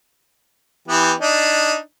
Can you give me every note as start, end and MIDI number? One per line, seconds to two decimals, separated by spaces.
0.88 1.13 52
0.88 1.13 59
0.88 1.13 67
1.20 1.77 62
1.20 1.77 63